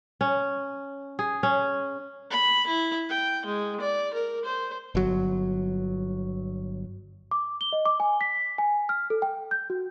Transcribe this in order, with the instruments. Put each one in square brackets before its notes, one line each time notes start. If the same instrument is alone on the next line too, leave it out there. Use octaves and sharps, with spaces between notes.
[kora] C#4
G#4
C#4
[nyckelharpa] B5
E4
G5
G#3
D5
A#4
C5
[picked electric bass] G1 F#3
[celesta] D6
G7
D#5
D6
G#5
B6
G#5
F6
A4
G5
G6
F#4